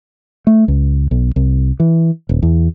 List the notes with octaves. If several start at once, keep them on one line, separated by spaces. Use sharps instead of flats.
A3
C#2
B1
C2
E3
D#1
E2